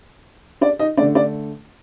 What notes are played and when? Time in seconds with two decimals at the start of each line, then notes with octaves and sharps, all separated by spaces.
0.61 D4 D5
0.79 D#4 D#5
0.97 D3 A3 D4 D5
1.15 D4 D5